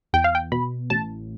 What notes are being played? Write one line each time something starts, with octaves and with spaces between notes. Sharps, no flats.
E2 G5
F5
G5
B2 B5
A1 A5